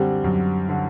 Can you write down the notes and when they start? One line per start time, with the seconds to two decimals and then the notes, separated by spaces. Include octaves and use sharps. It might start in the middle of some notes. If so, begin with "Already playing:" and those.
Already playing: F#2 D3 G3 C4
0.24 F#2
0.69 D3